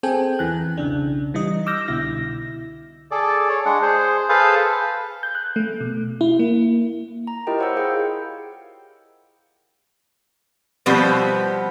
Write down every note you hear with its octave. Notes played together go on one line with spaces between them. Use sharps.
C4 G#4 A4 G5 G#5
E2 E3 F#6
B1 C#3 D4
E3 G3 D#4 D#5
D6 E6 F6 G6 A#6
C2 B2 D3 E4 A#6
G#4 A4 D5
C#5
G#3 D4 F#5
G#4 C5
G#4 A4 B4 C5 F5
G6
F#6
A3
B2
E4
A#3
A#5
E4 F4 G4 A#4 D#5 G5
C5 C#5 F#5 B5 E6 G6
G#4 F5 G5
B2 F3 G3 B3 C4 B4